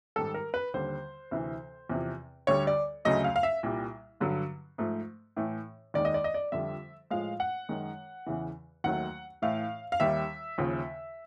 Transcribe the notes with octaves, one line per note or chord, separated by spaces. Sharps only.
G#2 D#3 G3 A4
A#4
B4
D#2 D3 G3 C5
D2 C3 E3
E2 C3 F3
D2 D3 G3 C#5
D5
D2 C#3 F#3 A3 D#5
F5
F5
E5
C2 A#2 G3
G2 D3 F#3
G#2 F3 A3
A2 E3 A3
D#2 D#3 G#3 D5
D#5
D5
D#5
D5
F2 D3 G3 E5
A2 F3 G#3 F5
F#5
F#2 D#3 G#3
E2 C#3 E3
D#2 D#3 F#3 A3 F#5
A2 E3 A3 F5
F5
D#2 D#3 G3 E5
D#2 C#3 F3